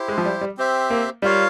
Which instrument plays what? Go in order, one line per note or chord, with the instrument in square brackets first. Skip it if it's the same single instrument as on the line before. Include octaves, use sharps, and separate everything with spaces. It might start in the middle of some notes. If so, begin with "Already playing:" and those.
Already playing: [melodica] E4 G4 C5
[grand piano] G#3
F3
G3
G3
[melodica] C4 G4 C5 E5
[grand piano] A#3
[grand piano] G3 [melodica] F4 A#4 C#5 F5